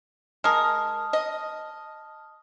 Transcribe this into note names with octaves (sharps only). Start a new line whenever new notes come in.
G#3 A#4 A5 D#6 F6
D#5